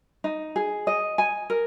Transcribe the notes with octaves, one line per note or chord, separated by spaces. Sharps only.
D#4
G#4
D#5
G#5
A#4